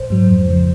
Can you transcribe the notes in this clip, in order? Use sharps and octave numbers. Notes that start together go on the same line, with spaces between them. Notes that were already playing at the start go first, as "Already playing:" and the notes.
Already playing: A#1 C5
G#2 F#3
F2
C#3 F3